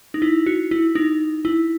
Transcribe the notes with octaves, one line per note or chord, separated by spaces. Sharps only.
D#4
E4
F#4
E4
D#4
E4